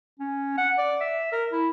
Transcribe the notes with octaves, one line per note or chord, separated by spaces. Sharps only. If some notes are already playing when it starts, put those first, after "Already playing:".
C#4
F#5
D5
E5
A#4
E4